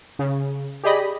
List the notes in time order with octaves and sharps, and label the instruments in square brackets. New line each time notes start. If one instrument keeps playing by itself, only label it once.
[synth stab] C#3
G4 G#4 D5 D#5 B5